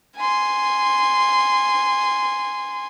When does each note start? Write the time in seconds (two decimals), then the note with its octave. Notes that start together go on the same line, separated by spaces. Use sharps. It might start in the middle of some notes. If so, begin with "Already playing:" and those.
0.17 G#5 C6